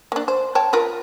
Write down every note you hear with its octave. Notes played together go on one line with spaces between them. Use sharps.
A#3 D4
C5
C#5 G5 A5
F4 A#4 B4